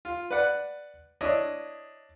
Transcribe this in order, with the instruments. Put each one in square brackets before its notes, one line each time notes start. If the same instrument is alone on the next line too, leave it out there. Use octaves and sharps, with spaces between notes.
[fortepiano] F4
B4 D5 F#5
D4 E4 C#5 D#5